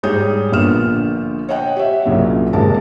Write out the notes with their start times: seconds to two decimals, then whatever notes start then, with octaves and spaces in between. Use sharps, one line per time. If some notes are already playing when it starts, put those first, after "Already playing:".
0.03 G#2 G3 G#4 C#5 D#6 G6
0.52 A#1 A#2 D3 B3 F6 E7
1.49 C#5 D#5 F#5 G5
1.76 G4 C#5 E5
2.05 C2 A#2 C#3 F#3
2.53 D#1 C3 G#3 A#3 A#4 A5